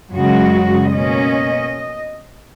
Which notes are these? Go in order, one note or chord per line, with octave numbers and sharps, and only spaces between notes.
F#2 C#3 G#3 F#4
B2 A#3 C#4 D#5